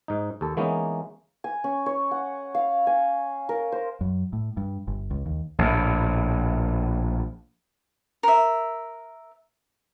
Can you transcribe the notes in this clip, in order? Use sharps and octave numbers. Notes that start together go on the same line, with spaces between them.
G#2 D#4
D#2 A4
E3 G#3 A#3 B3 C#4 D#4
G#5
C#4
C#5
F#5
F5
G#5
A#4
C5
F#2
A2
G2
G1
C#2
D#2
A#1 A2
A#4 E5